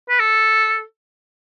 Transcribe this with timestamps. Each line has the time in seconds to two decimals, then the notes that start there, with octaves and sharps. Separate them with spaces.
0.09 B4
0.20 A4